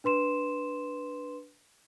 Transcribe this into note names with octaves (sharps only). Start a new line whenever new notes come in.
D4 B4 C6 E7